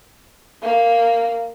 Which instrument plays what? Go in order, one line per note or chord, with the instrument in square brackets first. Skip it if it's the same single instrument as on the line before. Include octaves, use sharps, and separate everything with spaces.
[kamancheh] A#3